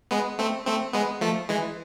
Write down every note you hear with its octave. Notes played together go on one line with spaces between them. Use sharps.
G#3 B3
A3 C4
A3 C4
G#3 B3
F3 A3
E3 G#3